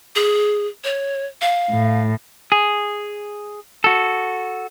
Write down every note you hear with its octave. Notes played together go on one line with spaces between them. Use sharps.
G#4
C#5
F5
A2
G#4
F#4 A4